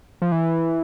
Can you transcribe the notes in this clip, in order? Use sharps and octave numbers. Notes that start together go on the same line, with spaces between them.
F3
E3